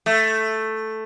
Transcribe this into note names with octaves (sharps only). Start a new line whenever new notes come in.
A3